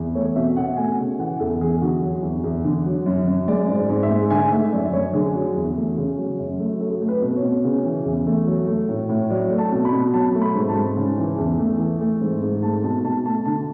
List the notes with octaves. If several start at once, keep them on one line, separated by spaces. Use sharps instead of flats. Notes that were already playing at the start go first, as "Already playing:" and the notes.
Already playing: E2
A3 C#5
B2 E5
B2 F#5
A3 G#5
C#3
E3 F#5
E2 A4
E2 G#4
D3 F#4
F#3
E2
E2
D3
F#3
F#2
F#2
G#3 D5
G#2
D5
G#2
E5
G#3
D3 G#5
A3 E5
F#2 D5
F#2 C#5
D3 G#4
F#3
E2
A3
C#3
F#3
F#2
A3
F#3 A4
A3
B4
B2
C#5
B2
C#3
E3
E2
A3
F#3
A3
A2
A2
F#3 D5
A3
A5
B2
B5
B2
F#3 A5
A3
B5
G#2
A5
G#2
C#3
E3
E2
A3
E3
A3
G#2
G#2
A3 A5
B2 A5
B2 A5
A3 A5
D3 A5